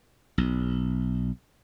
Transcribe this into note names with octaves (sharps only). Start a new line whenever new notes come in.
B1